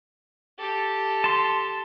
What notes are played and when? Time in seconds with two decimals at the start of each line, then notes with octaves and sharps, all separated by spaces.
0.59 G4 A4
1.24 A5 C6